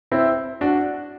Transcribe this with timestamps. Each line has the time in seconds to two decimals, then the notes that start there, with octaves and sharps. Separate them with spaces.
0.12 C4 E4
0.61 D4 F#4